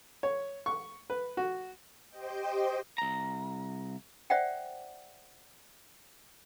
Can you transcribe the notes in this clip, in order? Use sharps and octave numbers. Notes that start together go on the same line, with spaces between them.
C#5
C#6
B4
F#4
G4 C5 D#5 G5
C2 A#5
C5 D5 E5 F#5 G5